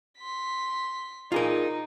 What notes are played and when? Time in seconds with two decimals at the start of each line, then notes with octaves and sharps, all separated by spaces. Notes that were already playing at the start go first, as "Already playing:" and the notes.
0.19 C6 B6
1.32 D#4 F4 G#4 A#4